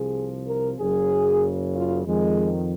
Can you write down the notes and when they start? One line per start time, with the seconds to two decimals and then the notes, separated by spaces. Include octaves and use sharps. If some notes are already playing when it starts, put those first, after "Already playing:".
Already playing: C2 C3 F3 G#4
0.47 A#4
0.79 F#1 F#2 C#3 G#4
1.75 F4
2.06 F2 D#3 G#3